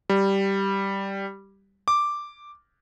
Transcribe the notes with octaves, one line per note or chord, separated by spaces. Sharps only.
G3
D6